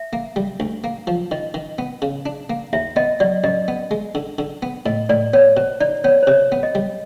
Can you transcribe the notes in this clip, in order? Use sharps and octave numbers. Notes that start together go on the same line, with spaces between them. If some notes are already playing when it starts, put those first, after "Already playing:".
Already playing: E5
A#3
G3
D2
A#3
F3
D#3 D#5
D#3
B3
C#3
D4
A#3
D#2 E5
B3 D#5
F#3 D5
F#2 D#5
B3
G#3
D3
D3
B3
A2 D#5
A2 D5
B3 C#5
B2 C5
D#4 D5
B3 C#5
C5
C3 C#5
B3
D#5
G3